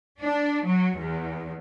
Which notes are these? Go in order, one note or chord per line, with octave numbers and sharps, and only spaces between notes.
D4
F#3
E2